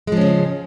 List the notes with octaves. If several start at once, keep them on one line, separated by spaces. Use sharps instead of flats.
C#3 F3 G#3 C#4